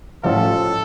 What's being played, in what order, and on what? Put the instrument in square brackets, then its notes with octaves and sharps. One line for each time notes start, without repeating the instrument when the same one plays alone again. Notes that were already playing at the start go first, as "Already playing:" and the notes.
[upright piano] A1 A2 F3 C#4 F4 [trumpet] A4